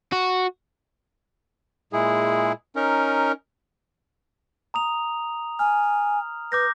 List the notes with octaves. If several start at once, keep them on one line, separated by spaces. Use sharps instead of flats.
F#4
A#2 G#3 E4 G#4
C#4 D#4 A#4
A#5 D#6 F7
G#5 F6
B4 D6 G6 A#6